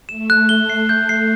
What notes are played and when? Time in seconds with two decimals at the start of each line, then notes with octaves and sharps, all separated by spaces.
0.09 A3 E7
0.30 F#6
0.49 G7
0.70 C7
0.89 A3 G6
1.09 C7